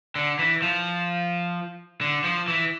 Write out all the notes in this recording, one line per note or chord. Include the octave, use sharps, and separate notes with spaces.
D3
E3
F3
D3
F3
E3